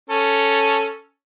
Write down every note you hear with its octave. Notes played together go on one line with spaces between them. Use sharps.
C#4 A4